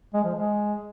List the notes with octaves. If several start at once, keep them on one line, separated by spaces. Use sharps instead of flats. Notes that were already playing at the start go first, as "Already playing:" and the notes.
G#3
F3
G#3